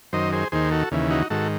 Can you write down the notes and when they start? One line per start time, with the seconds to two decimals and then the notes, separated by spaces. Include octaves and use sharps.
0.13 F#2 D#3 C5 D#5
0.32 G#4 C5
0.52 D#2 D#3 G#4 C5
0.71 F#4 A4
0.92 D#2 C#3 E3
1.10 D#4 F#4
1.30 G#2 D#3 F#4 A4